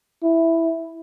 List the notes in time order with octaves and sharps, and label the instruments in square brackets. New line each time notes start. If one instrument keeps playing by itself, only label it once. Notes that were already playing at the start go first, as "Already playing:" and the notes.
[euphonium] E4